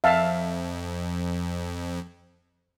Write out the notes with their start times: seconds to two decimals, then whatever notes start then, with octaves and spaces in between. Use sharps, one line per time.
0.04 F2 E5 F5 A5